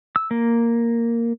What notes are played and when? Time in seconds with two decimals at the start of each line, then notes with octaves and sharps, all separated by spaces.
0.16 E6
0.31 A#3